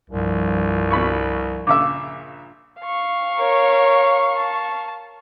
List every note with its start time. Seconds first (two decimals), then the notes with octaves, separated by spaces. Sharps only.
0.10 C2 G2 F3
0.91 B2 B5 C#6
1.67 A#1 C#3 E5 D6
2.81 F5 C#6
3.39 A#4 C#5
4.37 A5